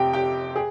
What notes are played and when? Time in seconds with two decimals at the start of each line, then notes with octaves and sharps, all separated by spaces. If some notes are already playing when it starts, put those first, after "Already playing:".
Already playing: F2 C3 G4 G5
0.13 G4 G5
0.56 G#4